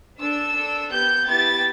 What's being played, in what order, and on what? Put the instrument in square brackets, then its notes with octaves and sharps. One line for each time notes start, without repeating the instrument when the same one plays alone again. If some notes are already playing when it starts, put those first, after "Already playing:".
[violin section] D4 A4 E6
D4 A4
B3 G4 G6
B3 E4 G4 A6